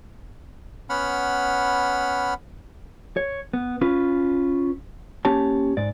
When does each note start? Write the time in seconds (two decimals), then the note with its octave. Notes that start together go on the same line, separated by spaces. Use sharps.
0.90 B3 C#4 F#5 B5 F6
3.17 C#5
3.53 B3
3.81 C#4 F4 B4
5.25 A#3 C#4 G4 C#5 A5
5.77 G#2 D5